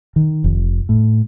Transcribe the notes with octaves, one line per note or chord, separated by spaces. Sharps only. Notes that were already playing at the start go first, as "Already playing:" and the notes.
D#3
F1
A2